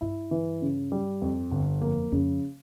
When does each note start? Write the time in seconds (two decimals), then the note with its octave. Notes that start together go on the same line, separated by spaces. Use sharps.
0.01 G2 E4
0.31 E3
0.62 C#3
0.92 G3
1.22 F2
1.51 G1
1.81 F2 A#3
2.12 F2 C#3